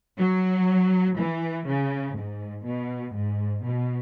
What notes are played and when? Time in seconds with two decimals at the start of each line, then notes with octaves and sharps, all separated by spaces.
0.19 F#3
1.18 E3
1.67 C#3
2.16 G#2
2.65 B2
3.15 G#2
3.64 B2